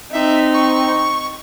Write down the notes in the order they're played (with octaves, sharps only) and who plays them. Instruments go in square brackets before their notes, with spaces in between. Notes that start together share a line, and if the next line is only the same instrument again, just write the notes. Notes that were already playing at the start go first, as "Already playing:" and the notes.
[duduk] C4 [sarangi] D#4 [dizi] E5
[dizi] C#6